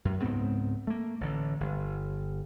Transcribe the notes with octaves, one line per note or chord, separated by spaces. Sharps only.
F#2
C#2 G#2 B3 C4
A3 A#3
A1 D3
G1